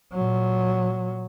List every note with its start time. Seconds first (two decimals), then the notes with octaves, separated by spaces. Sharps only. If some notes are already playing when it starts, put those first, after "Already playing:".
0.13 A#2 F#3